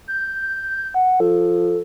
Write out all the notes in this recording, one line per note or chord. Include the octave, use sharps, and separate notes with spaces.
G6
F#5
F3 A4